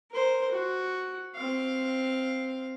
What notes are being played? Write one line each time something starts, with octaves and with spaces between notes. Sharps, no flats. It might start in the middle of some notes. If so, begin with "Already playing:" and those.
A#4 C5
F#4
C4 F5